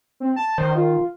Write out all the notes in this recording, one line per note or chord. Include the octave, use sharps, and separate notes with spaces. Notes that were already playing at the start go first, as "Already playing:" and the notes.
C4
A5
D#3 C5
F4